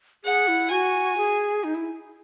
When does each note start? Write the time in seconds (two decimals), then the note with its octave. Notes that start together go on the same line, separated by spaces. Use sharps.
0.24 G#4 F#5
0.48 E4
0.70 F#4 G#5
1.17 G#4
1.64 D#4
1.75 E4